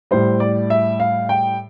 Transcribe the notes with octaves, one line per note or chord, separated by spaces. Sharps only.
A2 G3 C5
D5
E5
F5
G5